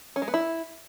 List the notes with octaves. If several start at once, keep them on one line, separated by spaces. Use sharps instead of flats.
C#4
G#3
B3
E4